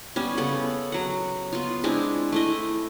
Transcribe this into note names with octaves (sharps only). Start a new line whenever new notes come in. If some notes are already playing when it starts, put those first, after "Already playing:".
G3 B3 C#4
C#3 B3 A4 F#5
F#3 F#5
B3 F4
G#3 C4 D4 E4
A3 E4 D#5